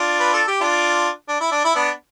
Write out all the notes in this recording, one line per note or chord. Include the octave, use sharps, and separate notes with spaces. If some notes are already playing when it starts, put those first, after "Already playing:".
Already playing: D4 F4
B4
A4
G4
D4 F4
D4
E4
D4
E4
B3 D4